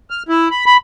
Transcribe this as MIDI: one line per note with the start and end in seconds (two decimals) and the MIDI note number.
0.10 0.23 89
0.29 0.49 64
0.51 0.65 83
0.66 0.77 83